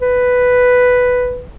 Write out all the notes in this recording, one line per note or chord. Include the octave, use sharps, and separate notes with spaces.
B4